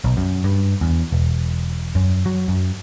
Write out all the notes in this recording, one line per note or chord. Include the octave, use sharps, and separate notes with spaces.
B1
F#2
G2
E2
E1
F#2
F#3
F#2